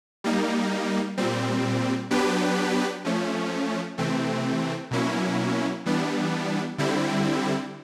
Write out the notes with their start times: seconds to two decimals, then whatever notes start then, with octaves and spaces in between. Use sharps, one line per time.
0.24 G3 A#3 D#4
1.18 A#2 G3 C4
2.11 F#3 B3 D4 G4 B4
3.05 F3 A3 C#4
3.98 C3 E3 A3 C4
4.91 B2 F#3 A#3 C#4 E4
5.86 E3 G3 B3 D4
6.78 D3 G3 C4 E4